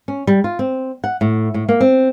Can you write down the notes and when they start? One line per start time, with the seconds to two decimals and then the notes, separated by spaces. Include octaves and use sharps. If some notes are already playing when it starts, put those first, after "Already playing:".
0.08 C#4
0.27 G3
0.44 F4
0.59 C4
1.04 F#5
1.21 A2
1.54 A2
1.69 A#3
1.80 C4